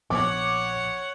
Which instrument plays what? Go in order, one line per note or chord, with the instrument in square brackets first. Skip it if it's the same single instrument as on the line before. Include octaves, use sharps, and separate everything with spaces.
[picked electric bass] A#1 F3 B3 [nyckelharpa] C#5 F#5 [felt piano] D6